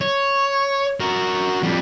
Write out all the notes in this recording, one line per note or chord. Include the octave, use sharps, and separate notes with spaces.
C#5
F#4 A#4
F2 G3